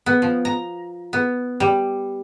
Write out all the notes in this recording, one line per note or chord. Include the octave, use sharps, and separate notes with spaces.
B3
F3
A#5
B3
G3